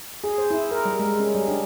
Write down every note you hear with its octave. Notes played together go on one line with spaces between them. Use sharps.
G#4
C5
E4
A#4
G3
G#3
C#4
G3
D4